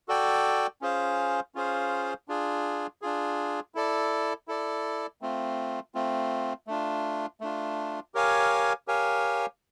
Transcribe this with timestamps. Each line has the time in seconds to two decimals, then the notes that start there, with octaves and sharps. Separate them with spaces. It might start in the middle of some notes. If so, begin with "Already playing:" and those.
0.08 F#4 A4 D5 G5
0.82 C#4 F4 G#4 C5 F5
1.55 C#4 F4 G#4 C5 F5
2.28 D4 F4 G#4
3.02 D4 F4 G#4
3.75 E4 A4 D5
4.48 E4 A4 D5
5.21 A3 C4 F4
5.95 A3 C4 F4
6.67 A3 D4 F4
7.41 A3 D4 F4
8.14 G4 A#4 C#5 F5 G#5
8.87 G4 A#4 C#5 F5 G#5